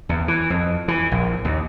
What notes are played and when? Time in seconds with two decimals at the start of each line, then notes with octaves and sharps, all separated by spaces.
0.09 E2
0.28 E3
0.50 F2
0.88 E3
1.12 A#1
1.45 D#2